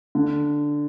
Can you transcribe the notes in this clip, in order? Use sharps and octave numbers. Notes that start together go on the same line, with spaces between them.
D3